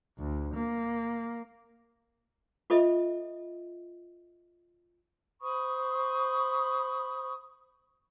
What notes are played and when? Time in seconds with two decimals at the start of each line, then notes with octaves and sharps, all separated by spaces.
0.18 D2
0.55 A#3
2.70 F4 A4 C5 D#5 E5
5.41 C5 B5 C#6 D#6